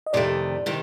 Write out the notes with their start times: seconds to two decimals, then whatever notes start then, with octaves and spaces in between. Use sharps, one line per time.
0.06 D#5
0.13 F2 C3 D#3 A3 D5
0.66 C3 D#3